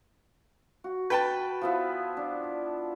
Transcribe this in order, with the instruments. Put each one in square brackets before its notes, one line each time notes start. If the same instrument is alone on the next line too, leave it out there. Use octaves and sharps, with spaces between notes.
[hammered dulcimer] F#4
[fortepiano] B4 G5 A5
[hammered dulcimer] F3 B3 E4
D4